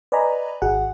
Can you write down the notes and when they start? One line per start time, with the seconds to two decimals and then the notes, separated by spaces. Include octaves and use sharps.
0.12 B4 D5 D#5 G#5 A#5 B5
0.62 G#1 F#4 G#4 F#5